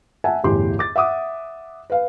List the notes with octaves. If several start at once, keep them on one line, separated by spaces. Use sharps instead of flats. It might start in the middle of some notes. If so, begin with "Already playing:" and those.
E5 F#5 G#5 A5
G1 E2 A2 G4 C6
D6 A6
E5 F#5 D6 D#6
B4 F5